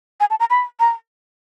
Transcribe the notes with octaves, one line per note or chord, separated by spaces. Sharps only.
G#5
A5
A#5
B5
A#5